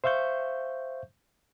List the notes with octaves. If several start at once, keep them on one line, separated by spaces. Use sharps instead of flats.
C5 E5 F5 C#6 G6